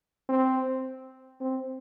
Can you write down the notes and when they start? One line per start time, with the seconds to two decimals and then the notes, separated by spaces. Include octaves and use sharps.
0.29 C4
1.41 C4